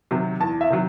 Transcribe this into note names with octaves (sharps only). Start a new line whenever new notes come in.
C3 D#3 F#3
E2 A5
E5
C3 D#3 F#3